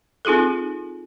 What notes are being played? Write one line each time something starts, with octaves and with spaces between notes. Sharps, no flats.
C4 D#4 F4 G#4 A4